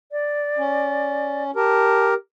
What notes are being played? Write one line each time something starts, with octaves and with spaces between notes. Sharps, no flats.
D5
C#4
G4 A#4 A5